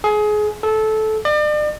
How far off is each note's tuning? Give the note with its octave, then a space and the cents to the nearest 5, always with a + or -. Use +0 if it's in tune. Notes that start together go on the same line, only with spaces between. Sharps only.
G#4 +25
A4 -15
D5 +40